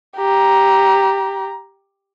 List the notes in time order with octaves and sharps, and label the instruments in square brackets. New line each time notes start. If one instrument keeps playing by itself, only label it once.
[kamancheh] G4 A#5